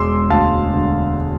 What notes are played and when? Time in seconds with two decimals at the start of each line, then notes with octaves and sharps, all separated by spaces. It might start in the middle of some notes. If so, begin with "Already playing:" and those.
Already playing: E1 G#3 C6 D6 E6
0.30 D2 F5 A5
0.74 D3